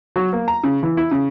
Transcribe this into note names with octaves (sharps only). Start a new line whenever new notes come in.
F#3
A#3
A#5
C#3
E3
E4
C#3